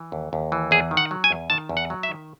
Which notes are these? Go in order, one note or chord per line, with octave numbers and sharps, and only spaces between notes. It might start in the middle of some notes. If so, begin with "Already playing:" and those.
Already playing: E3
D#2
D#2
E3
E2 G#4
D#3
F#5
F#3
G#5
E2
D#3 A5
E2
F#5
F#3
E5
D#3